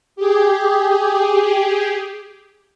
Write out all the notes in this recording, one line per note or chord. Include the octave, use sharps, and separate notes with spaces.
G4 G#4